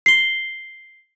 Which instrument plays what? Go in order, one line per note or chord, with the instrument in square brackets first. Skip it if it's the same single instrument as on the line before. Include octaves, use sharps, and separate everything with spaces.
[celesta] C7 G7